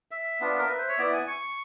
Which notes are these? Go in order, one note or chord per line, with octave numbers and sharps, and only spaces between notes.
E5
B3 D4 F4
A#4
B4
C5
C#5
B3 E4 D5
G#5
C#6